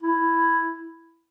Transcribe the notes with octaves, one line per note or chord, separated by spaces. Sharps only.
E4